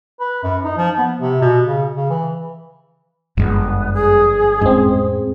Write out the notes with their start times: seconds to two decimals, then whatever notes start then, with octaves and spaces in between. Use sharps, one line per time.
0.20 B4
0.43 F#2
0.64 D#4
0.77 F3
0.98 B3
1.20 C3
1.41 B2
1.65 C#3
1.96 C#3
2.10 E3
3.37 G1 F#2 F3 G#3 B3
3.93 G#4
4.61 F2 A2 G#3 C4 C#4